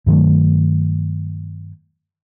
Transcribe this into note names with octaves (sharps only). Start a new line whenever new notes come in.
G2 D#3 F#3 A3